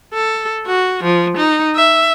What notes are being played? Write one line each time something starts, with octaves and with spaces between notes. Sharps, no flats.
A4
F#4
F3
D#4
E5